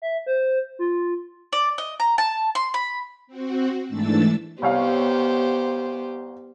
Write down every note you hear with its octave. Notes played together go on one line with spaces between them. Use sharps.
E5
C5
F4
D5
D#5
A#5
A5
C6
B5
C4 F#4
G#2 E3 A3 D4 E6 A6
C2 B3 G4 C5 C#5 F5